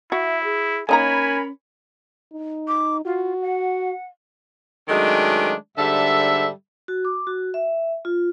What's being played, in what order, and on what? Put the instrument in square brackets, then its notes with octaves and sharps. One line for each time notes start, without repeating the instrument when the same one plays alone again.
[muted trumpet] E4 [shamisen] F#4 [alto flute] E5
[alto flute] G#4
[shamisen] A#3 D#4 A#5 [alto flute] C#4 [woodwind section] A#4 C#5 B5 [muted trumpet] G#5
[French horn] D#4
[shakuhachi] D6
[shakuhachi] F4 [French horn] F#4
[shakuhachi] F#5
[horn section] D#3 F#3 G#3 A3 C#4 D4
G#2 D3 G3 A4 E5
[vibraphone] F#4
D6
F#4
E5
F4